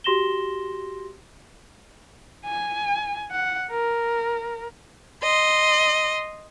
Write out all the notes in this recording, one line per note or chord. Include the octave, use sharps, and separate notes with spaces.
F#4 G4 C6 A#6 E7 G7
G#5
F#5
A#4
D#5 C6